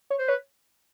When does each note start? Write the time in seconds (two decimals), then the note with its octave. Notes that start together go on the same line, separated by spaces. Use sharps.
0.10 C#5
0.19 C5
0.28 B4 C#5